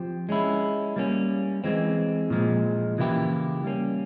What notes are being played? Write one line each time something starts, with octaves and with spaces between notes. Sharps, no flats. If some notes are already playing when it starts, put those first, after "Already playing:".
Already playing: F3 C4 G4
G#3 C#4 E4
G3 A#3 C#4
E3 G#3 C4
A#2 F3 G#3
C#3 E3 A#3 E4 G4
G3 A#3 C#4